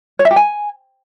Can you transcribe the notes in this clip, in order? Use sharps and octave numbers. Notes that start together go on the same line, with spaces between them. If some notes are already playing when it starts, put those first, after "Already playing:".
C#5
E5
G4
G#5